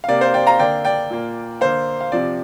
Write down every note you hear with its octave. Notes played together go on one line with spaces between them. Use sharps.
F5
C3 A#3 D5
C5 F5
D5 G5
F5 A#5
D3 A#3 D5 G5
D5 G5
A#2 A#3
D3 A#3 C5 F5
F5
C3 F3 C4 D5